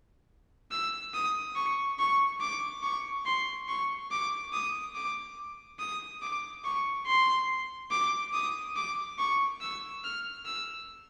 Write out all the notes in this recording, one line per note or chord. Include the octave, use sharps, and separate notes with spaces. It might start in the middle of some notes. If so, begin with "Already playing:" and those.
E6
D#6
C#6
C#6
D6
C#6
C6
C#6
D6
D#6
D6
D#6
D6
C#6
C6
D6
D#6
D6
C#6
E6
F6
E6